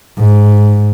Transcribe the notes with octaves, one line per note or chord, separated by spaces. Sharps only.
G#2